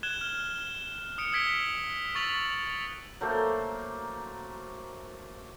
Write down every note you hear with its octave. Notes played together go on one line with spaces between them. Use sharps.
F#6 G#6 E7 G7
F6
D#6 C#7 D7
D#6 E6 G#6 B6 D7 G7
C#6 E6 A6 B6 F7 F#7
F#3 A3 A#3 C5